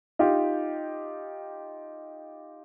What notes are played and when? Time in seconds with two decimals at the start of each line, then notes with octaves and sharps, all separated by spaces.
0.19 D#4 F4 G4